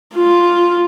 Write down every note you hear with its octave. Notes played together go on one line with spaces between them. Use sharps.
F4